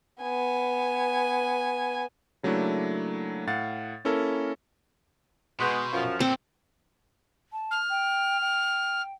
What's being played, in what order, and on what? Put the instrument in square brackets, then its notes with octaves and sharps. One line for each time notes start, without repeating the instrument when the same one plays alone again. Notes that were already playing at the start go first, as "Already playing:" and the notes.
[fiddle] B3 G#5
[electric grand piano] C#3 F#3 A3 A#3 D4 E4
A2 F5 F#5 A6
A#3 C#4 E4 A4 A#4
[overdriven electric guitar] B2 [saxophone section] G#3 B3 [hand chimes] C6 C#6 G6
[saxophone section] F#2 F3
[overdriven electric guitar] A#2 A4 [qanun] C4
[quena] A5
[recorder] F6
[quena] G5
G5